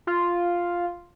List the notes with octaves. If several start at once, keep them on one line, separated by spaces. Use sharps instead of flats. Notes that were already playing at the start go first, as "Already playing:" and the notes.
F4